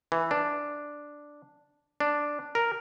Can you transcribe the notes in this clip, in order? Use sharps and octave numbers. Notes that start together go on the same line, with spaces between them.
E3
D4
D4
A#4